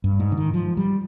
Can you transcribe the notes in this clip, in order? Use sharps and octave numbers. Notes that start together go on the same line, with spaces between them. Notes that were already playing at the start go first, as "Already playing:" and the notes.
G2
G#2
D3
D#3
F3
G3